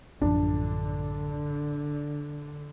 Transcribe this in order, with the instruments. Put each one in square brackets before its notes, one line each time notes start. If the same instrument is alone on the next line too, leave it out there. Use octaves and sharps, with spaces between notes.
[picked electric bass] A1 F#2 F3 [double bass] D3 [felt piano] D4